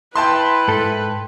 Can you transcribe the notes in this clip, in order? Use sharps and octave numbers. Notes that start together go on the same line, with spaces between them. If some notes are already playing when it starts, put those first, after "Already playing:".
E4 B4 G5 A5 C6
G#2 A4